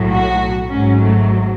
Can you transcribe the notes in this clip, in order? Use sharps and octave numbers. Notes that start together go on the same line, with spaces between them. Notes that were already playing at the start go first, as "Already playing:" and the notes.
Already playing: B1 A2 F#3
F#4
G#1 G#2 F#3 C#4
A3